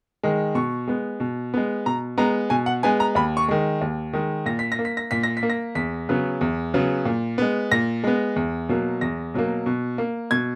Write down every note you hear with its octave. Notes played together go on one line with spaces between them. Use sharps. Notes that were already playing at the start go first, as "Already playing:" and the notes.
D#3 G#3
B2 C#6
G#3 B3
B2
G#3 B3
B2 A#5
G#3 B3 A#5
B2 G#5
F#5
G#3 B3 G#5
A#5
D#2 B5
C#6
D#3 G#3
D#2
D#3 G#3
A#2 A#6
B6
A#6
A#3
B6
A#6
A#2 B6
A#6
B6
A#3
A#6
E2 B6
C#3 F#3 B3
E2
C#3 F#3 B3
A#2
G#3 B3
A#2 A#6
G#3 B3
E2
B2 F#3 A#3
E2 A#6
B2 F#3 A#3
B2
A#3
B2 G#6